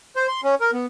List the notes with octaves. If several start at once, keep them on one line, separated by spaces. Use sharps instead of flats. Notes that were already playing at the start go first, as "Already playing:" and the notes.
C5
C6
C#4
A#4
B3